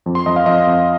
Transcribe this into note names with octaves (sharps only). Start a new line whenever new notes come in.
F2
C6
F2 D#5
F5
F2 D#5
F2